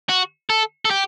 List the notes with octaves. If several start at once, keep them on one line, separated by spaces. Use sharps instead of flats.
F#4
A4
A4
G4